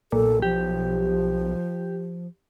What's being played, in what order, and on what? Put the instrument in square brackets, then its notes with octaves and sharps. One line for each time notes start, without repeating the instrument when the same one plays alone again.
[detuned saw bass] B1 [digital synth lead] A#2 [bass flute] A4
[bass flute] F3 [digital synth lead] G4